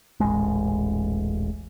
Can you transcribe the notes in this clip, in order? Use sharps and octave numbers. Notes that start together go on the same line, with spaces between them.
D#1 A1 G#3